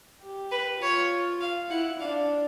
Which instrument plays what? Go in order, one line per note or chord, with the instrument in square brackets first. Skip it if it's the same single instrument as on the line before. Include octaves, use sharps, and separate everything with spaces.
[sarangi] G4
[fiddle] B4
[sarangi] F4 [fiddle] C#5
[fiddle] F5
[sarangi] E4 [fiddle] F#5
[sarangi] D4 [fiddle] F5